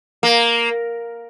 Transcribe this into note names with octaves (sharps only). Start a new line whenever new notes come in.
A#3